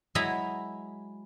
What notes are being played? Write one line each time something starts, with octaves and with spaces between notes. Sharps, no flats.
F#3 G#3 E4 G#4 A#5 B5